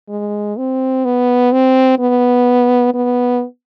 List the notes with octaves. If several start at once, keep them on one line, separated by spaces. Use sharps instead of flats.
G#3
C4
B3
C4
B3
B3